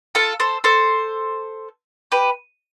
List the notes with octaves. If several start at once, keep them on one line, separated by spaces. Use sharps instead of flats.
F4 A4
A4 C5
A4 C5
G4 B4